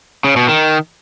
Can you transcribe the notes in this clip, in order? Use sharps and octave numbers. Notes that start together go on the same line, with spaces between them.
C#3
B2
D#3